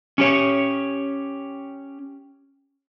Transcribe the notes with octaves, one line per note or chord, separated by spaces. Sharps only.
C#4 G4 C#5